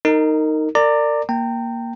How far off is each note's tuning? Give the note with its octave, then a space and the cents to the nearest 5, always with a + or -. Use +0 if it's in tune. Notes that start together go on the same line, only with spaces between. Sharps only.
D#4 +0 A#4 -25
A#4 -30 D5 +10 A#5 -25
A#3 +5 G5 +0 A#5 -35